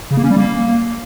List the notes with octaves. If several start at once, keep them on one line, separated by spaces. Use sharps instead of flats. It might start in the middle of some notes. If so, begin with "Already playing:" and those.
C#3
A#3
C#4
G3
A#3